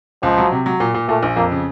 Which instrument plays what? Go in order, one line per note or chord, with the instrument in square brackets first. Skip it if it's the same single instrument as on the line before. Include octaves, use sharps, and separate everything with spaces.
[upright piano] C#2 [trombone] F3
[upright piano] F#3
C3
F#3
A#2
A#2
[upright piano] A#2 [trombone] A3
[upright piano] A#1
[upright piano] F2 [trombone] A#3
[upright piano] C#3